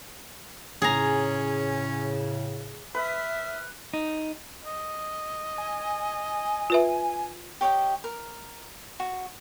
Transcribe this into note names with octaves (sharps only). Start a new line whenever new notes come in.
A2 C#3 C#4 G#4 A#5
B4 E5 D#6 F6
D#4
D#5
G#5
F4 B4 E5
G4 C#5 D#5 G5
A#4
F#4